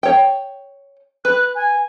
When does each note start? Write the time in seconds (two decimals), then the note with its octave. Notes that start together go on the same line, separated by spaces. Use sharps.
0.03 C#5 G5
1.25 B4 F#6
1.55 G#5